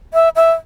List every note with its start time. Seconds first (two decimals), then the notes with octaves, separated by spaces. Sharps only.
0.13 E5
0.36 E5